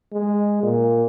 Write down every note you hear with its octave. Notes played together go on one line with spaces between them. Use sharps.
G#3
A#2